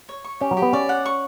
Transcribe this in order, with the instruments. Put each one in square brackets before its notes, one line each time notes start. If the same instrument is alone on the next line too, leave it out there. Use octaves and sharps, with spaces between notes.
[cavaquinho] C#5
C#6
[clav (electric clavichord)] C#4 [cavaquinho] G4
[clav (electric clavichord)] F#3
[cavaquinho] G4
[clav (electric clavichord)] B3
[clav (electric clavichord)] C#4 [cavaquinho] D5
[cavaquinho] F#5
C#6